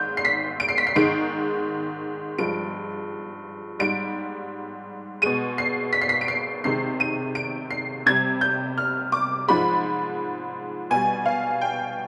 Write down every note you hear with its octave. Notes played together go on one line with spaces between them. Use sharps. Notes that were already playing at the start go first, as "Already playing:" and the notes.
Already playing: G#2 D#3 G#3 G6
C7
B6
D7
C7
B6
C7
G#2 D#3 G#3 D7
G2 F3 G#3 D7
G#2 G3 D7
B2 G#3 D#7
C7
B6
C7
B6
D7
C7
C3 D#3 G#3 C7
D#7
D7
C7
C3 G3 G#6
G6
F6
D6
G#2 F3 G#3 B5
B2 G3 G#5
F5
G5